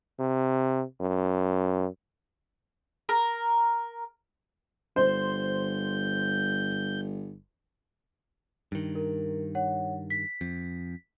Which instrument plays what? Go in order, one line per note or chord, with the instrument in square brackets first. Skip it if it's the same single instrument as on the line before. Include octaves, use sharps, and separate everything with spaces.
[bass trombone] C3
F#2
[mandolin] A#4
[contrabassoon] G1 [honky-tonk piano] C5 [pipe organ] G6
[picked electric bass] G2 D#3
[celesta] A#4
C#5 F#5
B6
[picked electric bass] F2